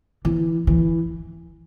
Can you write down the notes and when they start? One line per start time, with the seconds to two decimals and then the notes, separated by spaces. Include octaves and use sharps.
0.25 E3
0.67 E3